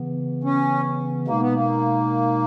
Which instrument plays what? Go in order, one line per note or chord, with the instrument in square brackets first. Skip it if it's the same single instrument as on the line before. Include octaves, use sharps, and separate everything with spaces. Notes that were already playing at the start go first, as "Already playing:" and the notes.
Already playing: [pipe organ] C#3 E3 B3
[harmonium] C#4
[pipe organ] B2 G#3 D#4 [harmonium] A#3
[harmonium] B3
A#3